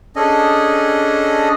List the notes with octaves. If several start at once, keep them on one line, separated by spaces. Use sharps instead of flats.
C#4 D4 G#4 A4 D#5